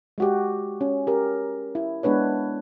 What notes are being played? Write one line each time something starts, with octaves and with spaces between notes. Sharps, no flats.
G#3 F#4 G4
C#4
G4 A#4
E4
G#3 B3 D4 B4 C#5